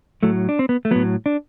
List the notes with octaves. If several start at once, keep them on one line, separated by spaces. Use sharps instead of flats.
A2 F#3 A3
D4
C4
B3
A3
A2 F#3 B3
D4